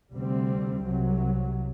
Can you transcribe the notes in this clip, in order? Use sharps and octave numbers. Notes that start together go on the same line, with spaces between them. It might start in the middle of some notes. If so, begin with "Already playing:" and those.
D2 C3 G3 C4
C2 C3 F#3